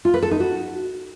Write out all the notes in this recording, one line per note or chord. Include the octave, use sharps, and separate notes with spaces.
F4
B4
A4
D#4
F#4